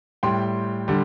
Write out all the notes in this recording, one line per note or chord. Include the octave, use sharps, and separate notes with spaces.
A2 G3 G5 C6
D3 G3